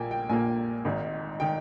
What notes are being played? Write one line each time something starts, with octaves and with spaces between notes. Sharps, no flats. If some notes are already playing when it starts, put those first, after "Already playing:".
Already playing: A#1 A#2 A#3 G5 G#5
G5
A#1 A#2 A#3 G#5
G#1 G#2 D#3
D#3 G5